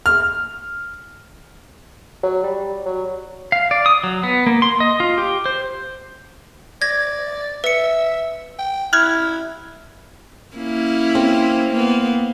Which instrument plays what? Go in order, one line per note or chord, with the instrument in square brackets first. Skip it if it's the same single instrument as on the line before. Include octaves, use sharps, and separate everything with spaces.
[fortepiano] F6
[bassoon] F#3
G3
F#3
[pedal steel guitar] F5
D5
D#6
F#3
B3
A#3
C6
D#5
F4
G4
C5
[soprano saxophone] D5 [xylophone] G#6 A#6
[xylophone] B4 C#7 [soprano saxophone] E5
[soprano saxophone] G5
[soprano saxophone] E4 [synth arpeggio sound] F6 F#6 G#6
[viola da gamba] A#3 C#4 E4
[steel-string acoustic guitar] C4
[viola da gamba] A#3 B3